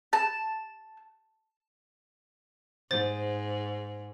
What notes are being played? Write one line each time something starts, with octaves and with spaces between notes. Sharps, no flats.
A5
G#2 C5 A6